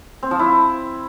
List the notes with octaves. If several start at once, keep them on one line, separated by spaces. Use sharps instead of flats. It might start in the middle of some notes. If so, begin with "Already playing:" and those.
C4
F3
E4